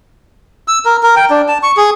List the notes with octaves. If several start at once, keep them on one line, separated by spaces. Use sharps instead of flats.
E6
A#4
A#4
G5
D4
A5
C#6
G#4